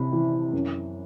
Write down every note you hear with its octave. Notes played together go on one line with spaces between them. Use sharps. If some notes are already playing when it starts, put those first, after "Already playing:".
Already playing: C3 E3 B5
E3
F#2